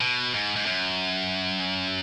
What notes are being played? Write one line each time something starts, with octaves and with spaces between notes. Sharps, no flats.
B2
G#2
G#2
F#2